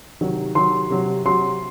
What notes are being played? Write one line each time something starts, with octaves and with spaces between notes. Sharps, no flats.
C3 D#3 F#3
C3 D#3 F#3 C6
C3 F#3
C3 F#3 C6